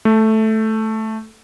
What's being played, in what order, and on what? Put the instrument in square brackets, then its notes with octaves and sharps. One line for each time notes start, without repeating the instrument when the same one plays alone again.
[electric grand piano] A3